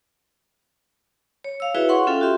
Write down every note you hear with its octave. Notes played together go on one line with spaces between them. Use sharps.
C#5
F5 E6
E4 F#4 G#4 B4 C#5 E5
F#5 C6 C#6
C#4 F4 A4 F5 G5
F#4 G4 E5 C6